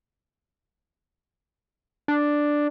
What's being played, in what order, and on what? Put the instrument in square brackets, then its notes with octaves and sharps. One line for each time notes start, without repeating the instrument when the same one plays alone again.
[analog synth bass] D4